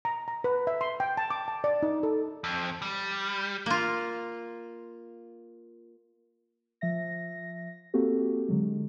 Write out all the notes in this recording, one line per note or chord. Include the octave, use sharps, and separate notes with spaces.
A#5
A#5
B4
E5
C6
G5
A5
D6
A5
D5
D#4
A4
F2
G3
A#3 F4
F3 E5 A#6
A#3 C4 F#4 G4 A4
D3 F#3 G#3